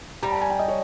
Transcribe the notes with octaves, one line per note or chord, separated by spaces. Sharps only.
G3 A#5
A5
G#5
G5
D#5
C#5